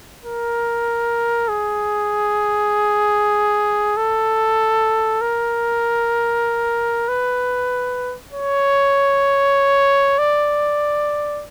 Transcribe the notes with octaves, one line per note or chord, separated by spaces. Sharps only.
A#4
G#4
A4
A#4
B4
C#5
D5